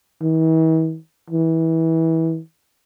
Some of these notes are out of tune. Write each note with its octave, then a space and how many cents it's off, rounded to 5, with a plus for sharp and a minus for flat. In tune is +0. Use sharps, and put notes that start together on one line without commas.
E3 -45
E3 -25